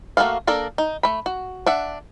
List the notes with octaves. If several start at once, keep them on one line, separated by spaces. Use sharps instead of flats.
A3 A#3 F#4 A4 F5
A#3 D4 A4 A#4
D#4
A3 B5
F#4
D4 E5 F#5